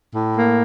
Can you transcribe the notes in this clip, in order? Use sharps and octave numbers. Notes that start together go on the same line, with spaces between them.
A2
A#3